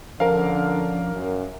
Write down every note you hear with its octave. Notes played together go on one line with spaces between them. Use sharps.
D3 F3 C#4 D4 A#4 F5
F#2